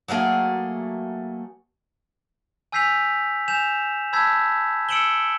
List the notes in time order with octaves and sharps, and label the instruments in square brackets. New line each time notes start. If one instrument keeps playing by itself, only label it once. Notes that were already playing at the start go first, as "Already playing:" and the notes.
[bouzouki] F#3 A3 A#3 G#4
[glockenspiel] G#5 E6 G6 B6 C7 F7
G#5 G6 E7 F7
A5 B5 E6 G6 G#6 B6
E6 C#7 D7 E7 F#7 G7